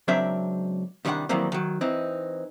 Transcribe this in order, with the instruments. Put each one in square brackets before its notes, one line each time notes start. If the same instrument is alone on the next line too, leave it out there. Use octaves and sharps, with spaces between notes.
[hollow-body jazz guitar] C#2 F#3 C4 D4 A#4 E5
C2 D#3 G3 A#3 D4 F#5
D#3 E3 F#3 G3 A#3 C4
D#3 F#3
E3 C4 D#4